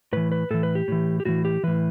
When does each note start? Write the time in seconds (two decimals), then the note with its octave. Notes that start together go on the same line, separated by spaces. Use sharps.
0.13 A2 E3 B4
0.32 B4
0.51 A2 E3 A4
0.63 B4
0.75 G4
0.88 A2 E3
1.20 G4
1.25 A2 E3 F#4
1.45 G4
1.63 A2 E3 B4